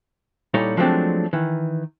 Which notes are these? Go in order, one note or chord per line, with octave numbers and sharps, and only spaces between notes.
A#2 G3 D#4 E4 A4 C#5
F3 F#3 G#3 A3 C4 D4
D#3 E3